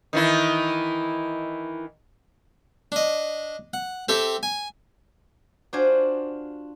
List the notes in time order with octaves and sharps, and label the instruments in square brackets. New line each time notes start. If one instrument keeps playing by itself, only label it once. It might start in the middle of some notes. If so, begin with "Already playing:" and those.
[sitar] D#3 E3 E4
[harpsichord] D4 D#5
F#5
C4 G4 A4 E5
G#5
[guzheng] D4 F4 F#4 C5 G#5